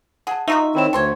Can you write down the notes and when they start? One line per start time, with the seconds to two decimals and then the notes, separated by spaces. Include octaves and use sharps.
0.27 G#4 F#5 A5
0.48 D#4 F4 F#4 E5 A#5 C#6
0.75 D#3 C4 E4 A#4 C#5 E7
0.93 D2 A4 C5 C#5 G5 G#6